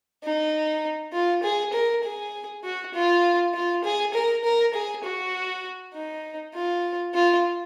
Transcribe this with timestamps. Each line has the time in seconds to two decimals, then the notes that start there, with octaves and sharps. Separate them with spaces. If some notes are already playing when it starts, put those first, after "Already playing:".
0.23 D#4
1.13 F4
1.43 G#4
1.73 A#4
2.04 G#4
2.63 F#4
2.94 F4
3.54 F4
3.84 G#4
4.14 A#4
4.44 A#4
4.74 G#4
5.03 F#4
5.94 D#4
6.54 F4
7.14 F4